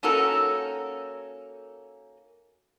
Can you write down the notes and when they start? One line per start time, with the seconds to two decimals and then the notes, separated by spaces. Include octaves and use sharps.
0.03 A#3 C#4 D#4 F#4 A4 A#4